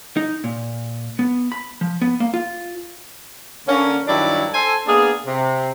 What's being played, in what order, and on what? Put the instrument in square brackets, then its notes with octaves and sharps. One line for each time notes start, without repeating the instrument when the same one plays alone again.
[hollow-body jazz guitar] D#4
A#2
B3
B5
F3
B3
A#3
F4
[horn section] D3 A#3 C#4
G2 D#3 F#3 D4 E4 D5
A4 C5 G#5
A#3 B3 D4 G#4
C3